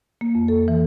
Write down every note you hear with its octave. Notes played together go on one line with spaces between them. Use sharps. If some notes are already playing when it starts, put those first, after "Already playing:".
A#3
F2
A4
E3